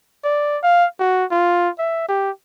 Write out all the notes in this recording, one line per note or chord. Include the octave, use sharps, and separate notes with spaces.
D5
F5
F#4
F4
E5
G4